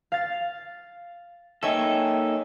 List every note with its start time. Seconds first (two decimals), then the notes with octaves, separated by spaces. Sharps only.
0.12 F5 A6
1.63 A#3 D#4 A4 C#5 D#5 E5 G5 G#5